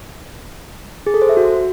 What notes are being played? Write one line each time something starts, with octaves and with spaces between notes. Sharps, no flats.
G#4
A4
C5
E5
F#4